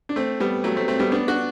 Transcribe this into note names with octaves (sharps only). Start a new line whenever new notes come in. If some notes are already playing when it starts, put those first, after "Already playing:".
D4
A3 C4
G3 B3
F#3 A3
A3 C4
A3 C4
G3 B3
B3 D4
D4 F#4